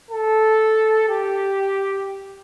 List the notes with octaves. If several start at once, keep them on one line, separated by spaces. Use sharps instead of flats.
A4
G4